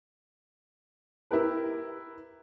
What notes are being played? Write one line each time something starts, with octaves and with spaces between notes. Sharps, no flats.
E4 G4 A#4 B4